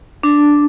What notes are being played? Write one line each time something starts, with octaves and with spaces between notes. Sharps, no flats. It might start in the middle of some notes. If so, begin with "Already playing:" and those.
D4